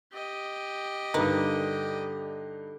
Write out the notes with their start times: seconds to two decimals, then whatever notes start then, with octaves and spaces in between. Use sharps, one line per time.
0.13 G4 D#5
1.14 G2 D3 D#4 A#4 B4